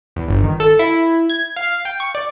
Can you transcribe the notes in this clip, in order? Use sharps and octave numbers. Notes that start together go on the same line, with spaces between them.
E2
G1
D#3
A4
E4
G#6
F5
G5
C#6
D5